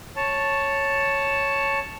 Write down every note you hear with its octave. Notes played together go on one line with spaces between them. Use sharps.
C#5 A5